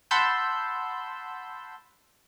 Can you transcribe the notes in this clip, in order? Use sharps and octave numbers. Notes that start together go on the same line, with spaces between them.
F#5 A5 B5 C6 E6 G6